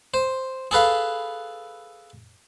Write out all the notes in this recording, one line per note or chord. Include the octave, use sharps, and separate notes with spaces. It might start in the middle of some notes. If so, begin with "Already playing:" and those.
C5
G#4 A4 B4 F5